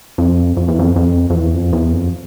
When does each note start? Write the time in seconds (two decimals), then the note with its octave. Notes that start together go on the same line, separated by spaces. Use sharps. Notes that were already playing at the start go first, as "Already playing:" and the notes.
0.18 F2
0.57 F2
0.68 E2
0.79 F2
0.96 F2
1.30 F2
1.35 E2
1.54 F2
1.73 E2
1.93 F2